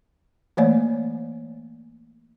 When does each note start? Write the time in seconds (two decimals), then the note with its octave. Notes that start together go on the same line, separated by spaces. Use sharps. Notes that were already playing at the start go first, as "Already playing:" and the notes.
0.57 E3 A3 A#3 C#5 D5 G#5